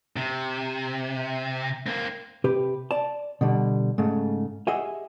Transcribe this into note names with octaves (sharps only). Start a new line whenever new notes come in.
C3
A#3 C4
C3 G4 B4
D5 A5
B2 D3 G3
G#2 C#3 A3
G4 G#4 D#5 E5 F#5 G#5